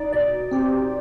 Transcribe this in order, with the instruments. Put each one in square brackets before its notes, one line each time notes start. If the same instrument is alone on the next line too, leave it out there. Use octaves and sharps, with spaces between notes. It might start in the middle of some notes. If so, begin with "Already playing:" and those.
Already playing: [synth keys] D#4 D5
B2 D5
C4 G4